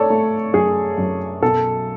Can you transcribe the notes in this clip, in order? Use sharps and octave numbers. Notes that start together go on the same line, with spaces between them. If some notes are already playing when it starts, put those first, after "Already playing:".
Already playing: A3 A4 C#5 D5
A3
F#2 G#4
F#2
B1 A4